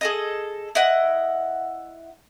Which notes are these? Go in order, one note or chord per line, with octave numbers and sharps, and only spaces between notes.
G#4 A4 D#5
E4 D#5 F#5